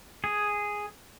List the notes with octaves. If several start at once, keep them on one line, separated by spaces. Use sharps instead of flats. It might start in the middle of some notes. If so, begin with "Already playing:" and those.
G#4